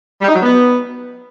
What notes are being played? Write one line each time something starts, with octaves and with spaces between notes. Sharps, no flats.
G3
D#4
F#3
B3